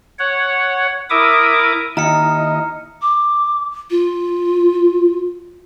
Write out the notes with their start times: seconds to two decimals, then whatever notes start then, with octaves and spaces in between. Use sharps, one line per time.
0.19 C#5 F#5
1.10 E4 A#4 E5 D6 D#6
1.97 D#2 D#4 E4 D#5 A#5 F6 C#7
3.02 D6
3.91 F4